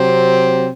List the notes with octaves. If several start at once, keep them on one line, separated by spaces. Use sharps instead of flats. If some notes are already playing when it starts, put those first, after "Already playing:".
Already playing: C3 F#3 C4